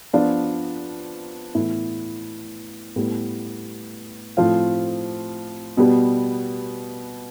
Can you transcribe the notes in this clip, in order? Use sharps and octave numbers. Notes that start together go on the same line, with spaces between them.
F3 B3 D4 F4
A2 E3 B3 E4
A2 G3 B3
A2 F3 C4 F4
B2 G3 B3